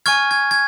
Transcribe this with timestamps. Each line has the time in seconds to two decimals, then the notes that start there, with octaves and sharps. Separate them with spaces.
0.06 G#5 C#6 F6 G#6
0.31 G#6
0.51 G#6